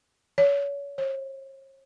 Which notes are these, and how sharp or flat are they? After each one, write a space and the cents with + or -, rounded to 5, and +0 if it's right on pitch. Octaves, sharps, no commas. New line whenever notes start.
C#5 +30
C#5 -45